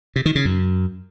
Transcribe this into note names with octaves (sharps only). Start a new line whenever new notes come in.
C3
D#3
C#3
F#2